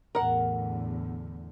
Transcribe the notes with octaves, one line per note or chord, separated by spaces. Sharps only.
E2 A2 D3 A#4 F#5